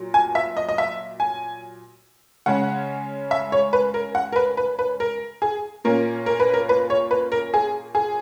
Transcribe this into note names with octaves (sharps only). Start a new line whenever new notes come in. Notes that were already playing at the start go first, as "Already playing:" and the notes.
Already playing: A#2 F#3
G#5
E5
D#5
D#5
E5
G#5
C#3 G#3 C#4 F#5
E5
C#5
B4
A#4
F#5
A#4
B4
B4
B4
A#4
G#4
A#2 A#3 C#4 A#4
A#4
B4
A#4
B4
C#5
B4
A#4
G#4
G#4